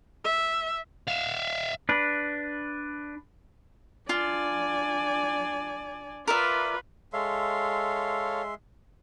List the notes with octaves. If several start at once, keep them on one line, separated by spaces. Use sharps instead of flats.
E5
E5 F5
D4 B4
D4 F4 D5 G#5
F4 A#4 B4 D5 E5
G#3 A4 C#5 E5 F5 C6